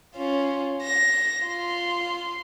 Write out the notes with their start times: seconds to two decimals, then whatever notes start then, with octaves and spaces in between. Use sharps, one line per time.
0.15 C#4 F4
0.82 A#6
1.45 F4 C6